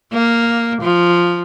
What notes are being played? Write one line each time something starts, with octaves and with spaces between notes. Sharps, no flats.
A#3
F3